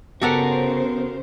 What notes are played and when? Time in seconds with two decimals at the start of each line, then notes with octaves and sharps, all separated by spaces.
0.22 C#3 B3 F#4 G4 A4 A#4 C5 F#5